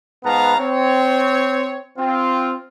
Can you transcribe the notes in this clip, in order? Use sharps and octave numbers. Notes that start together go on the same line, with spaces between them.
G#2 B3 B4 F5 A5 A#5
C4 C#5
C4 F4